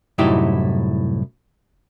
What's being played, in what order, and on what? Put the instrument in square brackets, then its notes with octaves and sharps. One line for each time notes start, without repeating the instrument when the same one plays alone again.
[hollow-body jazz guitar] C2 F#2 A2 D#4 E4 G4